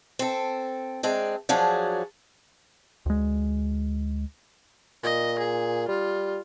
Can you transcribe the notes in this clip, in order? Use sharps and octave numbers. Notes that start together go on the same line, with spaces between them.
C4 A4
G#3 C4 D4
F3 F#3 D4 F#4 G#4
D2 G#3
A#2 D#5
G#4
G3 F4